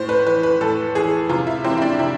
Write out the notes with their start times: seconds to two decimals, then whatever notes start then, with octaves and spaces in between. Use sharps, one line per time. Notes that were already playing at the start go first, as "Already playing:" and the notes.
Already playing: A2 C5
0.09 B4
0.26 E3 B4
0.43 B4
0.61 A2 A4
0.95 E3 G#4
1.29 C3 F4
1.47 E4
1.64 E3 C4
1.78 E4
1.82 D4
1.99 C3 E4